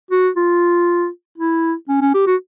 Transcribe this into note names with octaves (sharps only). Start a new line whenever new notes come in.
F#4
F4
E4
C#4
C#4
G4
F#4